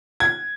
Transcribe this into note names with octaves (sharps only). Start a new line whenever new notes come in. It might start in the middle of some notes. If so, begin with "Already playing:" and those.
G#6